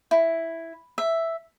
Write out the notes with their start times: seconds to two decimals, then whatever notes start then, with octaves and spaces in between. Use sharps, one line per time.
0.11 E4
0.98 E5